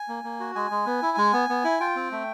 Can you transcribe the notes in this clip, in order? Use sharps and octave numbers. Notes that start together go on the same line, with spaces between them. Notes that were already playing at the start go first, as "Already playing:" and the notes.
Already playing: G#5
A#3
A#3
F#4
G#3 G#5
G#3
B3
E4
G#3
B3
B3
E4
F4 G5
C4
A3